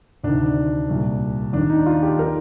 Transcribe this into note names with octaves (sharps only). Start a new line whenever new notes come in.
D2 C3 D#3 D4
C2 A#2
D#2 D#3 D4
D#4
F4
G4
D#3 A#4